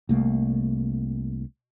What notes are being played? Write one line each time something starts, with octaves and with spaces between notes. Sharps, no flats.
C2 A3 A#3